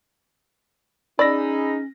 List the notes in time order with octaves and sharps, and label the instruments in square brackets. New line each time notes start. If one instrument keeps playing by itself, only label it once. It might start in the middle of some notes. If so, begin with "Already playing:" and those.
[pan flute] C#4 [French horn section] D#4 G#4 [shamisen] D5 [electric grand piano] B5 E6 A#6